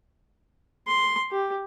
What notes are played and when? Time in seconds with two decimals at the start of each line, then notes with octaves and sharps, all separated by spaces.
0.87 C6
1.31 G4